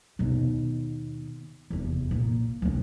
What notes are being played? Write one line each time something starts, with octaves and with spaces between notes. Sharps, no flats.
D#2 B2
F1 E2
A#2
E1 D#2